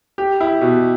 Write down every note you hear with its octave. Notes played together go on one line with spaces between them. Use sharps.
G4
E4
B2